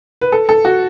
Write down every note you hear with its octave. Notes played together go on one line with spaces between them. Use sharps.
B4
A4
A4
F#4